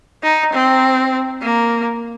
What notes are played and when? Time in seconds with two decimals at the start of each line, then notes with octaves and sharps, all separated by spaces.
0.23 D#4
0.53 C4
1.42 A#3